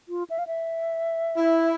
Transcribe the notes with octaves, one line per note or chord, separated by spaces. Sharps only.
F4
E5
F5
E5
E4